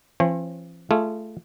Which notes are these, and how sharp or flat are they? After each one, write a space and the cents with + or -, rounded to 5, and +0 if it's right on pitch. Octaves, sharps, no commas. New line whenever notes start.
F3 -40 C4 +45 C#5 -45
A3 -10 F4 -20 G#4 +0